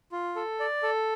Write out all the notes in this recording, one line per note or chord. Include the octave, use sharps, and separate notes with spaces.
F4
A4
D5
A4